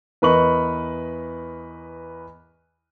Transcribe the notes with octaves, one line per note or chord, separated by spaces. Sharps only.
E2 A#4 B4 D#5 C#6 F#7